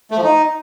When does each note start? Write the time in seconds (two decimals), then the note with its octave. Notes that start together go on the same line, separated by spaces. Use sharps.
0.11 A3
0.17 F3
0.24 D#4